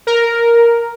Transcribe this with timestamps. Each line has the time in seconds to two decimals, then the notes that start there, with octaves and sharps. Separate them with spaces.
0.07 A#4